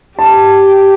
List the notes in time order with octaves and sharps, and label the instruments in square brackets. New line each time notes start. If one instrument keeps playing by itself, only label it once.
[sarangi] G4 [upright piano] A5